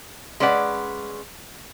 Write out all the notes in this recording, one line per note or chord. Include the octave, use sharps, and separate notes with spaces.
G#3 C#4 B4 D5 F#5